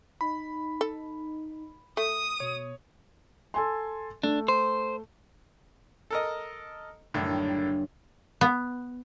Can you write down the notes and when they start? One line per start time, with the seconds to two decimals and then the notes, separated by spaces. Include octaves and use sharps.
0.21 D#4 B5
0.81 A4
1.97 A3 D#6
2.40 B2 C#5
3.54 A4 G#5 C6
4.24 A3 D4
4.48 C5
6.10 A4 A#4 D#5
7.14 F#1 A2 D3 D#3 G3 D4
8.41 B3